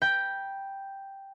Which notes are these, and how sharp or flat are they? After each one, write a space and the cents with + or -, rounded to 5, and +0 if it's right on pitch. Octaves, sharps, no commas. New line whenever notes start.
G5 +0 B5 -30